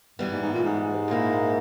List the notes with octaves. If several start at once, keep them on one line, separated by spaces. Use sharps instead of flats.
G2 E3 G3 B3
G#2
G#2
A#2
G#2
A#2 A#3 E4